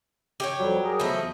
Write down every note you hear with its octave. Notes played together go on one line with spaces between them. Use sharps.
G4 C5 C#5
F2 F#3 G3
G#4 A#4
E2 F3 A3 E4 D#5